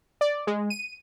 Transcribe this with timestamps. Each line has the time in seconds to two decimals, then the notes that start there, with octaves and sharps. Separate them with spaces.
0.21 D5
0.47 G#3
0.70 D#7